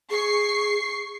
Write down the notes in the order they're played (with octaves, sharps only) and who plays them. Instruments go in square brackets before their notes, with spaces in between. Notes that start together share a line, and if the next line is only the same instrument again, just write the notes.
[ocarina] G#4 [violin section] C#6 C7